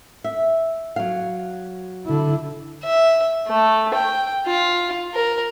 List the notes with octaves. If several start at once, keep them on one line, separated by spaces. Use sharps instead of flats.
E5
F#3 F5
D3 E4
E5
A3
G5
F4
A#4